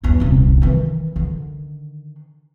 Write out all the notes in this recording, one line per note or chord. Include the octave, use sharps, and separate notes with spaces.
G1 E2
D#1 C2
D#3 E3
D3 D#3